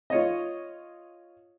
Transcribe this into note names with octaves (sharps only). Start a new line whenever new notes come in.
F4 C#5 D#5